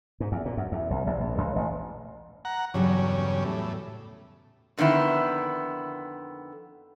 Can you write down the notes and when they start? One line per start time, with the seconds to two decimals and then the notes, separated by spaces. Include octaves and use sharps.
0.20 G#2
0.32 E2
0.45 A#2
0.57 F#2
0.72 E2
0.90 C2
1.07 A#1
1.20 A#1
1.38 C#2
1.56 A1
2.45 F#5 A#5
2.74 E2 G2 C#3 F#3 A4
3.44 A2
4.77 F2 D3 D#3 B3 E4